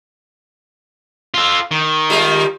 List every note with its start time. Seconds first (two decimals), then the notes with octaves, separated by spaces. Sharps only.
1.34 F4 A4
1.71 D#3
2.10 G3 G#3 F4